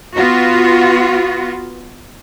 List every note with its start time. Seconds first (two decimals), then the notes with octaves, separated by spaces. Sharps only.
0.15 B3 F4 F#4